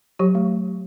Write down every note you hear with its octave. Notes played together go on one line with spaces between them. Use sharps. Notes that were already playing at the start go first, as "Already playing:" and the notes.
F#3 G4
A3